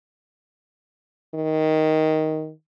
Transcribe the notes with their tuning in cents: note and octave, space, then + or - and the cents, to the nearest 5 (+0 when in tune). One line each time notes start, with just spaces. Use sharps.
D#3 +10